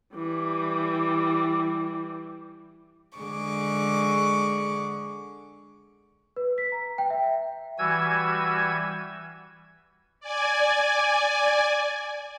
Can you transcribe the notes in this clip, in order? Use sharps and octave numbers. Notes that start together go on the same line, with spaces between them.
E3 G3
D3 G#3 G#4 C#6 D6
B4
B6
A#5
G5
E5
E3 G3 F#4 G#5 E6 G#6
D5 G#5